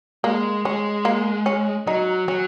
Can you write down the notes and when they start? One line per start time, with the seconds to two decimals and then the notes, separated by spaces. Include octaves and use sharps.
0.24 G#3 A#3
0.65 G#3 C#4
1.05 A#3
1.46 C#4
1.87 F#3 D#4
2.28 F#3 C#4